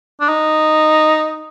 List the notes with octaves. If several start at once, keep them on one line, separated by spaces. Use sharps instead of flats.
D4
D#4